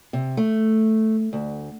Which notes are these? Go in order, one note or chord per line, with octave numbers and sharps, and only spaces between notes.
C3
A3
D2